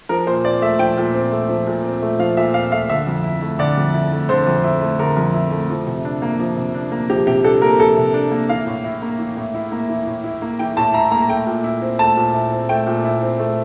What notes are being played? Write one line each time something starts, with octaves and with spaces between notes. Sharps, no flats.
F3 A#4
A#2 C5
C4 D5
A3 E5
F3 G5
A#2
C4
A3
F3
A#2
C4
A3
F3 F5
A#2 E5
C4 F5
A3 F5
D3 E5
F2
E4
A3
D3 D5
F2
E4
A3
D3 C5
F2
E4
A3
D3 A#4
F2
E4
A3
F3
C3
D4
A#3
F3
C3
D4
A#3
F3 G4
C3 G4
D4 A4
A#3 A#4
F3 A4
C3
D4
A#3
E3 F5
A2
E4
A#3
E3
A2
E4
A#3
E3
A2
E4
A#3
E3 G5
A2 A5
E4 A#5
A#3 A#5
A3 G5
A#2
E4
C4
A3 A5
A#2
E4
C4
A3 G5
A#2
E4
C4
A3